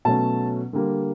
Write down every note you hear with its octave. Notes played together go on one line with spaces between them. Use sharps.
B2 F#3 A3 C#4 A5
D3 G3 A#3